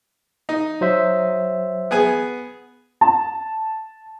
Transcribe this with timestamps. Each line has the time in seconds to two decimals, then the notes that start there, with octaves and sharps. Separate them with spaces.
0.49 D#4
0.81 F#3 C5 E5
1.91 B3 G#4 G#5
3.01 A5